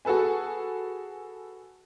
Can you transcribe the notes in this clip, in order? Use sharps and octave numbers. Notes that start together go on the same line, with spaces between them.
F#4 G#4 A4 B4 G#5